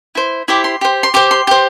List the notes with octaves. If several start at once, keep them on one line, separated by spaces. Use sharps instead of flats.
E4 C5
E4 G4 C5 D6
C6
G4 C5
C6
G4 C5 D6
C6
G4 C5